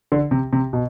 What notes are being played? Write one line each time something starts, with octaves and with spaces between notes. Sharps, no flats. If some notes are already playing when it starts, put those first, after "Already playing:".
D3
C3
C3
B2